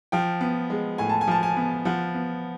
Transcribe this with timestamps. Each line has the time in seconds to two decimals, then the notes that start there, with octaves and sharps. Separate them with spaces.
0.12 F3 G5
0.41 B3
0.70 G#3
0.98 A2 G#5
1.09 A5
1.21 G#5
1.27 F3 A5
1.43 G#5
1.57 B3
1.85 F3 F#5
2.15 B3